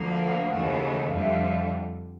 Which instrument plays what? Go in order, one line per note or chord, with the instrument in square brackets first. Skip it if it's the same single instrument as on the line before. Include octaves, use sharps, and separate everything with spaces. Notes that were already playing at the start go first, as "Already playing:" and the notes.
Already playing: [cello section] D2 D3 F3 A#3
[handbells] F5
F#5
F5
[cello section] D#2 C#3 E3 A3 [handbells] F#5
[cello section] F2 D3 G3 [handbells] F5
[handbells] E5
F5